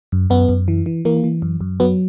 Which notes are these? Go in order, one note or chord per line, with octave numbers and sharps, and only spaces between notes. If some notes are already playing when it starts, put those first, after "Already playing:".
F#2
F#2 B3
F#2
E3
E3
E3 A#3
E3
F#2
F#2
F#3 B3